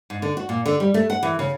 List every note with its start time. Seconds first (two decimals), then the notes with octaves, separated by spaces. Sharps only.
0.10 G#2
0.22 D3
0.37 F#4
0.49 A#2
0.66 D3
0.80 G3
0.94 A3
1.10 F#5
1.23 E3
1.39 C#3